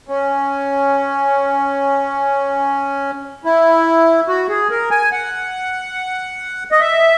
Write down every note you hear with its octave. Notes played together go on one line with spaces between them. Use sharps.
C#4
E4
F#4
G#4
A#4
G#5
F#5
D#5
E5